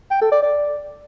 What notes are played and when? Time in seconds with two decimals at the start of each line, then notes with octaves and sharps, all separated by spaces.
0.11 G5
0.21 A4
0.32 D5
0.42 D5